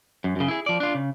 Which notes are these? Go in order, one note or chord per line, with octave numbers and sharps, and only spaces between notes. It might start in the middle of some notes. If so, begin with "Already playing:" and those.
F#2
F#2 C#3
E4 G#4
F3 D5
D4 F4
C#3